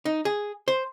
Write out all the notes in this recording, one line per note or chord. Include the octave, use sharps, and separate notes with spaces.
D#4
G#4
C5